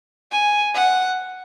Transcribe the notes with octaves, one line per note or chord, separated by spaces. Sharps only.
G#5
F#5